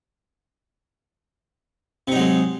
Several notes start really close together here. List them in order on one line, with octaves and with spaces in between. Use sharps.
C3 D#4 F#3 G#3